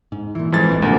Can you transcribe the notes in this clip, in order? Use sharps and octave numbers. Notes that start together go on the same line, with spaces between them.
G#2
A#2 E3
F2 E3 F3 G#3 A6
D1 G#1 G#2
D2 G2 C3 F#3 A#3